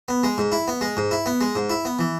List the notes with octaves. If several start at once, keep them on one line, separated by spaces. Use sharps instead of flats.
B3
G#3
G#2
E4
B3
G#3
G#2
E4
B3
G#3
G#2
E4
B3
E3